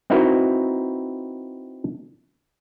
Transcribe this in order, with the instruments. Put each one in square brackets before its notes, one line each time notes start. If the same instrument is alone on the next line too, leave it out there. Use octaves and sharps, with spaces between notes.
[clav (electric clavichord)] C4 D#4 E4 F#4 A#4 B4